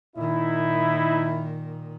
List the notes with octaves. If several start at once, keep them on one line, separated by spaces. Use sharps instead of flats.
A#2 D#3 D#4 E4